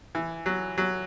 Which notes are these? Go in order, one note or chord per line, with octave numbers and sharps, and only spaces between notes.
E3
F#3
F#3